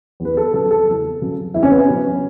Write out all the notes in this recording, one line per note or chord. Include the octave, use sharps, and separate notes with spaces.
E2
B4
A4
C#3 F#3 A4
A4
E2
C#3 F#3
E2 E4
C#4
B3
C#4
C#3 F#3